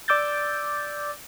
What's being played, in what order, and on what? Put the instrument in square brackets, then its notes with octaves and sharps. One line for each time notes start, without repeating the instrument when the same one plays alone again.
[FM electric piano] D5 D6 E6 G6 A6